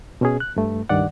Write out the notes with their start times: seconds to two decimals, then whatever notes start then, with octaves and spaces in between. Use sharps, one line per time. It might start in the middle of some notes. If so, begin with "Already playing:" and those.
0.21 B2 C#4 G#4
0.40 F#6
0.56 G2 A3
0.89 C#2 G2 D#3 D5 F#5